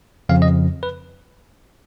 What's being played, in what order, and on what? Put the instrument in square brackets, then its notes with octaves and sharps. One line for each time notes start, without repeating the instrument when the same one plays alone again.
[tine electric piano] F2 C#3 F3 F5
D#5
B4